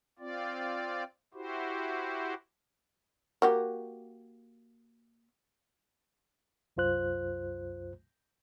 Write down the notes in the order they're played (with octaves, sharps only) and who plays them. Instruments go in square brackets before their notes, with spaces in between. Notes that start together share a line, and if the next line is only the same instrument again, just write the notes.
[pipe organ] C4 F4 D5
E4 F#4 G4 C5
[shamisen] A#3 F#4 G4
[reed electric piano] C2 F#2 F4 C5 F#6